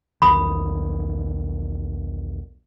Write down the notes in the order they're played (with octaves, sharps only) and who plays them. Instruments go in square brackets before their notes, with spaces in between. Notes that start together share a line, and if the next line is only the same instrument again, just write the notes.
[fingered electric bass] B1 E2 D#3 [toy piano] B5 D#6